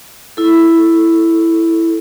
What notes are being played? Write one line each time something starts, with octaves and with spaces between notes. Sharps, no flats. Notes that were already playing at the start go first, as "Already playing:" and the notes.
E4 A4